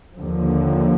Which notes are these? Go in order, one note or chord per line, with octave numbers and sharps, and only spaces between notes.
D#2 D3 F3